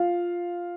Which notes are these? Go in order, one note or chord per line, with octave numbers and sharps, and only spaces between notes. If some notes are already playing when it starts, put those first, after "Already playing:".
Already playing: F4 F5